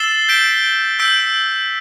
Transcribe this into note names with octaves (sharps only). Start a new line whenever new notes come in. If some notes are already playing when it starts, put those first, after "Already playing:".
Already playing: E6 A6 C7 E7 G7
G6 B6 D7 G7
E6 G6 B6 D7